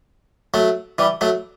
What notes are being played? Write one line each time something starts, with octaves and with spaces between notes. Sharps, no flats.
F#3 A3
E3 G3
F#3 A3